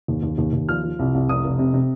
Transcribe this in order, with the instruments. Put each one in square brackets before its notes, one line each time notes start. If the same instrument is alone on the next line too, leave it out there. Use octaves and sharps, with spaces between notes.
[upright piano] D#2
D#2
D#2
D#2
F3 F6
F3
C2
C2
F1 D#6
F1
C3
C3